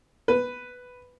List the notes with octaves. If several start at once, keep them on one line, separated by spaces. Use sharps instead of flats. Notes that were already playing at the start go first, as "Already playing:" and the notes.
B4